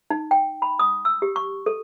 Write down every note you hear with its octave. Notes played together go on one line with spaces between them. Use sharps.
D#4
G5
B5
D#6
E6
G4
C#6
A4